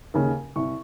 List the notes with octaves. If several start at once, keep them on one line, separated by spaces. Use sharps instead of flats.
D#2 C#3
C2 C#6